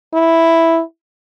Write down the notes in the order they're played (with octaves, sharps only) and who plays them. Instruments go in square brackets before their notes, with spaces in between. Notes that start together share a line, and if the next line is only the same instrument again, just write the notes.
[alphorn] E4